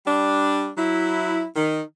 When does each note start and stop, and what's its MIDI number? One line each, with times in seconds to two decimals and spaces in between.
0.05 0.69 55
0.05 0.69 62
0.77 1.44 54
0.77 1.44 64
1.56 1.81 51